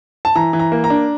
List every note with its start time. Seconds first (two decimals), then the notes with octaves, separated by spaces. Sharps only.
0.25 A5
0.36 E3 A#5
0.53 E3
0.59 A#5
0.72 A#3
0.84 A#5
0.90 D4